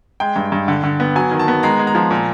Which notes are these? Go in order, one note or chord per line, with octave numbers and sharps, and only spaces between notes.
G#3 G5
G2
G2
D3
D3
B3
F#3 G#5
D#3
A5
B3
G#3 A#5
G#3
A#5
F3
A#2